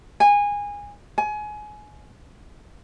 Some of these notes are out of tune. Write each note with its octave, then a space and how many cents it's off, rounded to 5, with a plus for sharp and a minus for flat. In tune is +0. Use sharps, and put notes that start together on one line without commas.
G#5 -20
G#5 +25